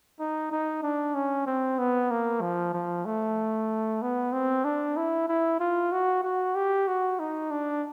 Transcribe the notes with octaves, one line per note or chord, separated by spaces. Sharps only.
D#4
D#4
D4
C#4
C4
B3
A#3
F3
F3
A3
B3
C4
D4
E4
E4
F4
F#4
F#4
G4
F#4
D#4
D4